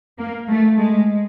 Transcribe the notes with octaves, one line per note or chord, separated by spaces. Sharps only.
A#3
A3
G#3